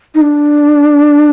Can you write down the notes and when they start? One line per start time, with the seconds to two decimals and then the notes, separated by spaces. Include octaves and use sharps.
0.15 D#4
0.21 D4